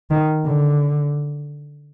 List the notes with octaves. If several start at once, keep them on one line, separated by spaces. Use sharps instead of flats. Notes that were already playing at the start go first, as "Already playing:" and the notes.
D#3
D3